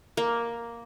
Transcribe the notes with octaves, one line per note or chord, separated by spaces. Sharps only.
A#3